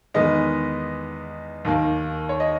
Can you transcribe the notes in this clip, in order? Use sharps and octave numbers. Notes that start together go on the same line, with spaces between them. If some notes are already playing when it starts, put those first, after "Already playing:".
E2 D#3 G#3 B3 D#5
D#2 D#3 A#3
C#5
D#5